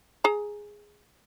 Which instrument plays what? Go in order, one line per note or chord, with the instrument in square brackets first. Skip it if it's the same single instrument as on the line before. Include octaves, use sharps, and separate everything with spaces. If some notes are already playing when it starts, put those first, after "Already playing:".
[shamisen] G#4 A#5